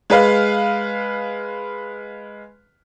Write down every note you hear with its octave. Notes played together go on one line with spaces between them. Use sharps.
G#3 B4 F5